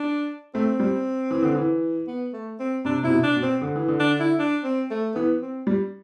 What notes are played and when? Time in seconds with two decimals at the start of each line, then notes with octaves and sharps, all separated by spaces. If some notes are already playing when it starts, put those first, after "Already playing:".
Already playing: D4
0.54 A3 C4
0.80 G3
1.31 E3
1.43 D3
1.55 E3
2.08 B3
2.33 A3
2.60 C4
2.85 C3 D4
3.03 C3 E4
3.10 B2
3.23 D4
3.36 B2
3.43 C4
3.61 D3
3.76 E3
3.88 D3
4.00 D4
4.20 E4
4.39 D4
4.64 C4
4.91 A3
5.15 E3 B3
5.42 C4
5.67 G3